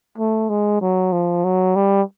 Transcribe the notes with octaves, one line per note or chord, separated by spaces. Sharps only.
A3
G#3
F#3
F3
F#3
G3